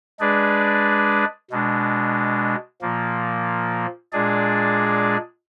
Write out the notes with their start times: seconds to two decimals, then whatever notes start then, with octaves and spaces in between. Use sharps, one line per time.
0.20 G#3 D4 G#4 B4 D5
1.50 B2 G#3 D4
2.82 A#2 F3 A#3
4.12 A#2 G#3 D4 G#4 D5